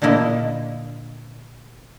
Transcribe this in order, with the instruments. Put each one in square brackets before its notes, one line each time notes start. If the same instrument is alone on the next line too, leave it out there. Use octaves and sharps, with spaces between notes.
[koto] A#2 D3 A#3 E4 D#5